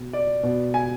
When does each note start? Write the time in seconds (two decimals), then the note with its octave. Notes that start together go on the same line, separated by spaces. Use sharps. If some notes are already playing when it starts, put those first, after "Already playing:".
Already playing: B2
0.13 D5
0.43 B2
0.74 G#5